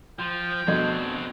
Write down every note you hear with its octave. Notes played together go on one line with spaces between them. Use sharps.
F3 G5
F2 B2 A3 C4 D4 F#4 D#5 G#6